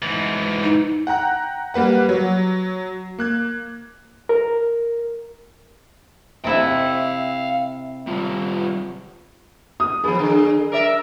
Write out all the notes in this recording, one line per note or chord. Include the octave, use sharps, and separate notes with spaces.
G#2 E3
D#4
F#5 G5 A#5 F#6
G3 A#3 B4 F#5
F#3
A#3 F#6 G#6
A#4
C3 E4 E5 F5 G5
G3 F4
D#6
F3 B3 G#4
D3
A#4 D5 E5